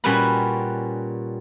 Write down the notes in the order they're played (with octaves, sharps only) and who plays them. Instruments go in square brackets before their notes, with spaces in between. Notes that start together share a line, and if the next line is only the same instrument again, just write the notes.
[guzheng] A#2 G3 C#4 F#4 B4 B5